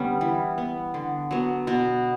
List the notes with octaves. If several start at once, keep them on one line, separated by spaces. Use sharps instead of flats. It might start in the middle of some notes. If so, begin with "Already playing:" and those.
Already playing: D3 G3 B3 C#4
E3
B3
D3
F#3 B3
B2 B3